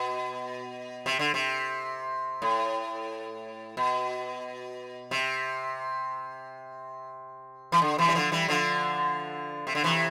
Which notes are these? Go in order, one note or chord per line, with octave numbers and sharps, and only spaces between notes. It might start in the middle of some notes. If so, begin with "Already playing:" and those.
Already playing: B2
C3
D3
C3
A2
B2
C3
E3
D3
C3 E3
G3
D3 F3
E3 G3
D3 F3
C3
D3
C3 E3